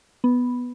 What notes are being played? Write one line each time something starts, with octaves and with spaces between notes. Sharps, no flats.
B3